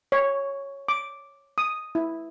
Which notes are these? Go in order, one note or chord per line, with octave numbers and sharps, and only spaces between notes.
C#5
D6
D#6
E4